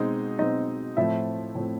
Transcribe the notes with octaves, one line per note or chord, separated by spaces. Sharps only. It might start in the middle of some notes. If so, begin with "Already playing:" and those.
Already playing: B2 G#3 C4 D#4 D#5
B2 G#3 C4 D#4 D#5
A2 F3 A3 C4 E4 E5
A2 F3 A3 C4